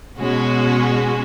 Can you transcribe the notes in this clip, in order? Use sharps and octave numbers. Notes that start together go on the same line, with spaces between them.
B2 G#3 C#4 F#4